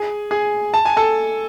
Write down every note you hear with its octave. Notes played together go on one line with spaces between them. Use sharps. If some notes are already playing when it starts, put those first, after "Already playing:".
Already playing: G#4 G#5
G#4 G#5
A5
G#5
A4 A5